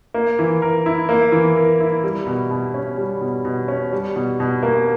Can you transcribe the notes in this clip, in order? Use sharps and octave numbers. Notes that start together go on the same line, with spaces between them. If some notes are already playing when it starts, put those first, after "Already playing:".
A#3
E3
A#4
E4
A#3
E3
A#4
E4
G3
B2
B2
C#4
G3
B2
B2
C#4
G3
B2
B2
A#3